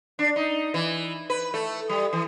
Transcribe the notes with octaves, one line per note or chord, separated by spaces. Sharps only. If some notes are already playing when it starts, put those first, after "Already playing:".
D4
D#4
E3
B4
A3
G3
E3